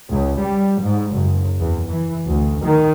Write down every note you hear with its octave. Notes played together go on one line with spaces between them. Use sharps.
C#2
G3
G#2
F#1
E2
E3
D2
D#3